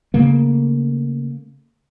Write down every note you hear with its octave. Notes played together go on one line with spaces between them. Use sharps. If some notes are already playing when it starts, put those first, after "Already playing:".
C#3 A3 A#3